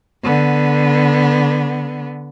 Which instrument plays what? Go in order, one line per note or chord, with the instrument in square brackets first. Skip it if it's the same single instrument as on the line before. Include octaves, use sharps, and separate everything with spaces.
[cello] D3 B3